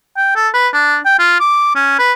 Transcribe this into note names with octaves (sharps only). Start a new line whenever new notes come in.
G5
A4
B4
D4
G5
F4
D6
C#4
B4